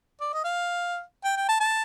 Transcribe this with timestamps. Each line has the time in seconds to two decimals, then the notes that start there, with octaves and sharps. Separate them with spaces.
0.21 D5
0.33 D#5
0.44 F5
1.25 G5
1.36 G5
1.48 A5
1.60 A5